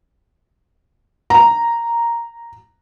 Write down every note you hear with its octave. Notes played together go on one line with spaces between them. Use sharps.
A#5